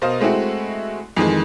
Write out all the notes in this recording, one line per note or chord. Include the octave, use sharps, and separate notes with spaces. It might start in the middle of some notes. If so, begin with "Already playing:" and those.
B2 A#4 C5 D#5 F5 D#6
G#3 A3 C4 E4 F#4
F2 D#3 E3 G#3